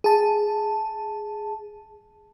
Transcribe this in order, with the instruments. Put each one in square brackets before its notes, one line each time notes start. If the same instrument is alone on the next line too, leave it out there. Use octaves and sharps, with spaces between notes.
[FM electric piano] G#4 A5